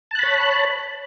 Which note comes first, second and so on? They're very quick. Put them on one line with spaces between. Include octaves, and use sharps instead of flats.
A5 F#6 B5 C#5